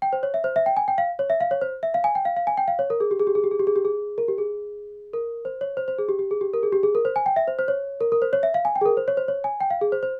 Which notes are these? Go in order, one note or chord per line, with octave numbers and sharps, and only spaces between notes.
G5
C5
C#5
E5
C5
E5
G5
G#5
G5
F5
C#5
E5
F5
C#5
C5
E5
F5
G#5
G5
F5
F5
G#5
G5
F5
C#5
A#4
G#4
G4
G#4
G4
G#4
G4
G#4
G4
G#4
G4
G#4
A#4
G4
G#4
A#4
C5
C#5
C5
C5
G#4
G4
G4
G#4
G4
A#4
G#4
G4
G#4
A#4
C5
G#5
G5
E5
C5
C5
C#5
A#4
A#4
C5
C#5
E5
F5
G#5
G5
G#4
A#4
C5
C#5
C5
C#5
G#5
G5
F5
G#4
C5
C5